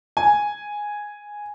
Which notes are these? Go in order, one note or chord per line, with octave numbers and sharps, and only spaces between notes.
G#5